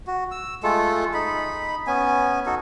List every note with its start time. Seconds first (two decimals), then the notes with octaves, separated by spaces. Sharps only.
0.07 F#4
0.31 E6
0.63 G#3 A3 F4 A4
1.14 D#4 B5
1.87 B3 C#4 G#5
2.46 D#4 F#4 A4